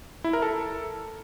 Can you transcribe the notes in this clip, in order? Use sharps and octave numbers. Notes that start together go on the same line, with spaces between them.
E4
A#4
A4